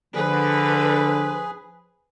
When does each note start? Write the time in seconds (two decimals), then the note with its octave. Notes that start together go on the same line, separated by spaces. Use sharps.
0.15 D3 F3 G#4 B4